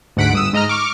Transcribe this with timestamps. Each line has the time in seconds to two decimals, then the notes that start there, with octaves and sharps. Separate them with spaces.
0.17 D2 G#2 F#5 B6 D7
0.33 G1 D#6 E6
0.53 G#2 D#5 A#5 F6
0.68 C#6 D6 F6